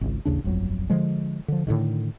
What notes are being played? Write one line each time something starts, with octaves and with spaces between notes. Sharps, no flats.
G#1 C#2
A1 D#2 C#3 D4
D1 G1 F2 F#3
D3 F3 G#3
D3 F3
A2 D3 D#3